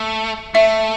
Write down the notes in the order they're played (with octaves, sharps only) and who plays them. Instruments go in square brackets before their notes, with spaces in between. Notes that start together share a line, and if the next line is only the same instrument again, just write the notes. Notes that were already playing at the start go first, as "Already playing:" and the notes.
Already playing: [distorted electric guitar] A3
[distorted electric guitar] A3 [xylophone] E5